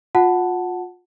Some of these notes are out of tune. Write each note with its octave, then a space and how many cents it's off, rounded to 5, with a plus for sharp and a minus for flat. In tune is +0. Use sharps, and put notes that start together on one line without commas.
F4 +30 F#5 +0 A5 +0